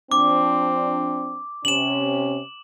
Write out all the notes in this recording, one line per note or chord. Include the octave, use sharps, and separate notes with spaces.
F3 C4 D4 D6
C3 C#4 E7 F#7